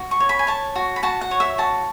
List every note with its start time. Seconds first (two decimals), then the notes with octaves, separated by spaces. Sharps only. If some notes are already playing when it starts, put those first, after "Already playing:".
Already playing: F#4
0.11 C#6
0.20 C#5
0.29 B5
0.39 G#5
0.47 C#5 A5
0.75 F#4
0.96 B5
1.03 F#4 A5
1.21 F#5
1.31 C#5
1.40 E5
1.58 F#4 A5